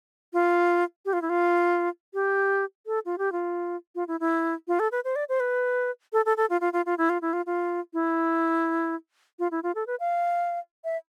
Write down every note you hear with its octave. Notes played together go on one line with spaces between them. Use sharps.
F4
G4
F4
E4
F4
G4
A4
F4
G4
F4
F4
E4
E4
F4
A4
B4
C5
D5
C5
B4
A4
A4
A4
F4
F4
F4
F4
E4
F4
E4
F4
F4
E4
F4
E4
F4
A4
B4
F5
E5